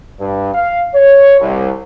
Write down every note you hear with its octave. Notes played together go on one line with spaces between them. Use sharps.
G2
F5
C#5
C2